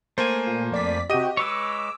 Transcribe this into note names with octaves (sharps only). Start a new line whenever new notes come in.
A3 A#3 C5 G#5
A#2
F2 D5 B6
C3 F#4 G4 D#5 D#7
G#3 B4 C#5 D6 E6